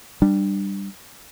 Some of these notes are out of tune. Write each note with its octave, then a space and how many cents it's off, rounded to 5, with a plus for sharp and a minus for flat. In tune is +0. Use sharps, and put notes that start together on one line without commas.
G3 +0 D4 +20